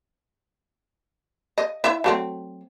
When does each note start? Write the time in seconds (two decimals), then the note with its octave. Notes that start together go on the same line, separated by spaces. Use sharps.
1.58 D#5
1.84 E4 E5
2.04 F#3 A3 C4